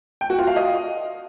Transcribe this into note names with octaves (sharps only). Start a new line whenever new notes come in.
G5
F#4
F4
F5
D#5